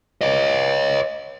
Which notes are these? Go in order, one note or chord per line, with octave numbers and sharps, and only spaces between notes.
C#5 D#5